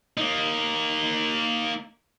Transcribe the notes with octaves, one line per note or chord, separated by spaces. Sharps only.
A#3 D#4